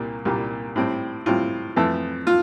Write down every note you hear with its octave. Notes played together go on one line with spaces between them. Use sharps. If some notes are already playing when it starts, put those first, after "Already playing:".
Already playing: C2 A#2 G3 A#3
C2 A#2 G3 A#3
A2 G3 C4
A2 G3 C4 F4
F2 E3 A3
F4